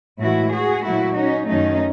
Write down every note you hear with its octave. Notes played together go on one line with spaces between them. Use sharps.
A2 E3 G#3 E4 F#4
F#4 G#4
A#2 F#3 A3 E4 F#4
C#4 D#4
F#2 D#3 F#3 A3 C#4 D#4